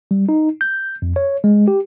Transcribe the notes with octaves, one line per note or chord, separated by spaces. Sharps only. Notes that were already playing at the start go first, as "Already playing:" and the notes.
G3
D#4
G6
F2
C#5
G#3
G4